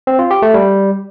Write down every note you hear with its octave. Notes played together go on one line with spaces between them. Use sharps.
C4
F4
G4
A3
G3